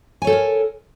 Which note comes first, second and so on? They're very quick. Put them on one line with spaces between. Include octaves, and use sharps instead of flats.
G#5 C#5 A4 C5 A#4